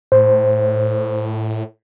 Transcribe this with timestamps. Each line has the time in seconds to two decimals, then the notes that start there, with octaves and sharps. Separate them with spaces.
0.12 A2 C5